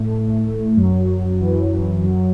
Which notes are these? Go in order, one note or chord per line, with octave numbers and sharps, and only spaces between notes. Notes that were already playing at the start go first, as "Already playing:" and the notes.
Already playing: A2 A3
F#2 F#3
E3
F#2 F#3